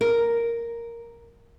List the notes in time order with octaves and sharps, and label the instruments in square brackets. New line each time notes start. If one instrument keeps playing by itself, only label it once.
[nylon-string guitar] A#4